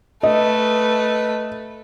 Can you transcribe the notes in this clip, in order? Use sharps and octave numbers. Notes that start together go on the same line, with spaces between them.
A3 B4 D#5